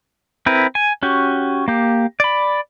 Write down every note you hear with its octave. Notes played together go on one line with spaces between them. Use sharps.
C4 E4 A#4 B4
G#5
C#4 F#4 G4
A#3 G4
D5 B5